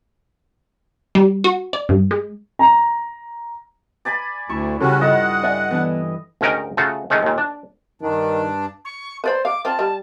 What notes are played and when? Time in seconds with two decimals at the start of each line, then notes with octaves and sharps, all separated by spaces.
1.15 G3
1.44 F#4
1.73 D5
1.89 G2
2.11 G#3
2.59 A#5
4.05 D5 G#5 B5
4.49 D2 E4 C#6
4.80 C#3 G3 C#4 F#4 A4
5.01 G2 F4 A4 D#5 F#5 F#6
5.43 D5 E5 G#5
5.71 E3 B3 D4
6.41 D2 G#2 C#4 A#4 D#5 G5
6.77 C#3 A3 F4 F#4
7.10 D#3 G#3 A3 C#4
7.23 D#2 A#2
7.38 D4
8.02 G2 D#3 D4
8.84 C#6
9.24 B4 C5 D5 B5
9.45 F5 D6
9.65 C4 F4 A5
9.79 G3